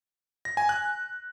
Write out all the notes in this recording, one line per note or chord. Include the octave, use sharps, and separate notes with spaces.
A#6
G#5
F#6